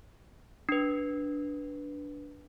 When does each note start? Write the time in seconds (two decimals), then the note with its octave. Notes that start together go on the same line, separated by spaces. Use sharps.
0.69 D4 B4